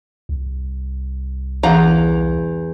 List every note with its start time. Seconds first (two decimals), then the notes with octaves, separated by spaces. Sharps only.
0.29 C2
1.63 E2 F5 F#5 A#5